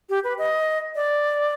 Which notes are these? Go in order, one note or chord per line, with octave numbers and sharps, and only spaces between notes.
G4
B4
D#5
D5